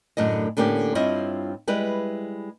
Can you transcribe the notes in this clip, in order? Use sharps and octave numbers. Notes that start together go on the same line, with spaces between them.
F#2 A2 D3 D#5
A2 D3 A#3 C#4 G4
G2 C4 E4 F4 C#5 D#5
G3 G#3 E4 B4